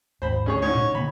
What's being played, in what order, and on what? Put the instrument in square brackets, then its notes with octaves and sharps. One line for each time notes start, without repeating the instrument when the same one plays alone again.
[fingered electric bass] D#2 G#2 [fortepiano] C5 B5
[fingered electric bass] D2 D4 [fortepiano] C#4 G#4 C#5
[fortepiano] G#2 C#4 [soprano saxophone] C#5
[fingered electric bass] A#2
[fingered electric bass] D3 A#3 [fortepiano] B5